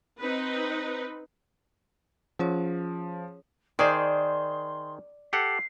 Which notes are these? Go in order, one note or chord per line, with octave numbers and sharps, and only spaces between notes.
C4 D#4 B4
F3 C#4 G#4 C#5
D#3 G#4 C5 D5 C6
G4 A4 F#5 C7